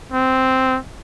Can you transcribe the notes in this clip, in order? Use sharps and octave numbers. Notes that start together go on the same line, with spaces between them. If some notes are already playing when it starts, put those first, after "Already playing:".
C4